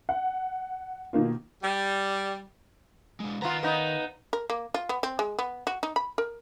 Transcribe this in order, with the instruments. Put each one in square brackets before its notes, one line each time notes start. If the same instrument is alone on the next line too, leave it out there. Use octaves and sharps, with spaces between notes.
[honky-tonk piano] F#5
B2 D#3 A#3 F4
[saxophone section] G3
[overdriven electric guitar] G#3 D4
[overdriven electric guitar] D#3 A#5 [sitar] B3 F4
[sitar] B3 D#4
[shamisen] A#4
A#3
F4
B3
C4
G#3
B3
F#4
D#4
B5
A#4